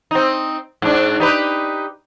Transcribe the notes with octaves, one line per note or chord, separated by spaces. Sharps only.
C4 D#4
G#2 D4
D#4 G4 B4